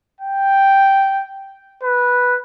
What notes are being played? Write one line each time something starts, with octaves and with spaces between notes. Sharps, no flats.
G5
B4